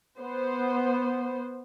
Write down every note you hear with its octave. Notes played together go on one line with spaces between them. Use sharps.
B3 C5